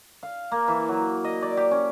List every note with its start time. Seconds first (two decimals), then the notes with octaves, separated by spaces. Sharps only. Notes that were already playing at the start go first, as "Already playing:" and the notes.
0.23 F5
0.52 A#3
0.68 E3
0.88 F#3
1.24 D#5
1.42 D5
1.57 G4
1.71 C#4